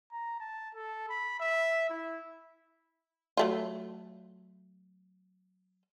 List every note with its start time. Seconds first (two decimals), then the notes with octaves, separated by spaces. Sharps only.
0.12 A#5
0.40 A5
0.75 A4
1.09 B5
1.40 E5
1.90 E4
3.37 F#3 A3 F4